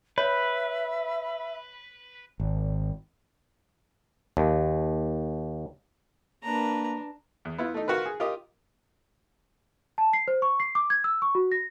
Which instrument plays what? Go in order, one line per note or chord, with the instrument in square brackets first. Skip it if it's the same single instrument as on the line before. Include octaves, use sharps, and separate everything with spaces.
[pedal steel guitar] B4 [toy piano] C#5 [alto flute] E5
[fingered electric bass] G#1
[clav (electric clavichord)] D#2
[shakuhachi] A#3 [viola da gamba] D4 [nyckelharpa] B4 A#5
[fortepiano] E2
B3 E4 F4
A3 D#4
F4 F#4 A#4 B4
G#4
F4 G4 A#4 D#5
[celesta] A5
C7
C5
C#6
C7
D6
G#6
E6
C#6
F#4
A#6